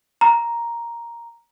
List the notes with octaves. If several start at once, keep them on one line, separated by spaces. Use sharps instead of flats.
A#5